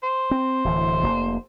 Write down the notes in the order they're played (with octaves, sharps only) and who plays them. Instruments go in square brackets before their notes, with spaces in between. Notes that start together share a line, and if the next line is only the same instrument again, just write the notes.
[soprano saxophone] C5
[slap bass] C4
D1 E3
F1 A#3